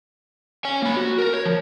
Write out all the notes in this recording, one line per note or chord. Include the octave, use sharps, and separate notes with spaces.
C#5 G#5
A#3 B5
F#4
A#4
C#5
F3